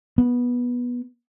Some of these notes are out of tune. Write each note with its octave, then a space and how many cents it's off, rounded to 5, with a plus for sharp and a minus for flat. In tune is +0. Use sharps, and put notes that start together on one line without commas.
B3 -15